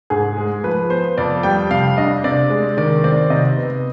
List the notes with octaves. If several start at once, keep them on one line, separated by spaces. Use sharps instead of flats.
G#2 G#4
G#3
F3 B4
B3 C5
F2 D5
G3 G5
C3 F5
D4 D#5
C3 D5
G#3
D#3 D5
C4 D5
C3 D#5
B3